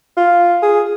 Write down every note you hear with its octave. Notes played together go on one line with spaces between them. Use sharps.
F4
G#4